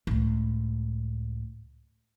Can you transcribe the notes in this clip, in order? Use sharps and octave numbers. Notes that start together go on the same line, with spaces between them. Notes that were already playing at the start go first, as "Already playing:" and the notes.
C#2 A2